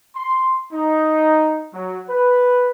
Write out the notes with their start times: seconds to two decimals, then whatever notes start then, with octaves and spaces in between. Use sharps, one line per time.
0.15 C6
0.72 D#4
1.73 F#3
2.09 B4